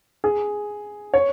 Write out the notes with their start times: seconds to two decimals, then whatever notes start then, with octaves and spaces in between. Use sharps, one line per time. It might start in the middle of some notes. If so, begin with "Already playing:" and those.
0.24 G#4
1.14 C#5